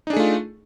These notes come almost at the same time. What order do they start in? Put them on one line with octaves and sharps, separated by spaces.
D#4 D4 G#4 A3 F4